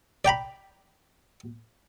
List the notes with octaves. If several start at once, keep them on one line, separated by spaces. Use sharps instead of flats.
D5 G5 A#5 B5